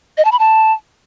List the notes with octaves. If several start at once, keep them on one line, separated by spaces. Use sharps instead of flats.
D#5
A5
B5
A5